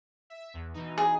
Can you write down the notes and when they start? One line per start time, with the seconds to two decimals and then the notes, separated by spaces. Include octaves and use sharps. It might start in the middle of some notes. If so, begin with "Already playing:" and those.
0.30 E5
0.54 E2
0.74 B2 E3 D#4
0.98 G#4